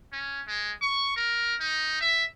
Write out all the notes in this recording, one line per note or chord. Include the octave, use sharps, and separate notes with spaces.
C#4
G#3
C#6
A#4
D#4
E5